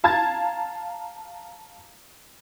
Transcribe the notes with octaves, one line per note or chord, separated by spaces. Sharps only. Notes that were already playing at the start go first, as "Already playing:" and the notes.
F5 A5 A#5 G#6 A6